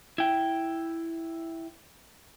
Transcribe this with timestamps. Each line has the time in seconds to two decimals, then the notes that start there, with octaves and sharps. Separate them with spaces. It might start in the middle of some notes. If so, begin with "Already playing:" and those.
0.18 E4 G5